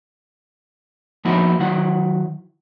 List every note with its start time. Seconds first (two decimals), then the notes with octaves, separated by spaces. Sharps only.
1.25 F3 A#3 B3 D#4 E4 F#4
1.59 D#3 F#3 E4 F#5